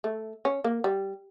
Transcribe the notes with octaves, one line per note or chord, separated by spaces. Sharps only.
A3
C#4
A#3
G3